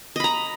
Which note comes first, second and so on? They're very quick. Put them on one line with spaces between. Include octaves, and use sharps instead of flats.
D#5 B5 A#5